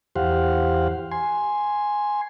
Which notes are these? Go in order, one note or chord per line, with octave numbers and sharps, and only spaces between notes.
E2 G4 C5 F5 F#5
G#5 C6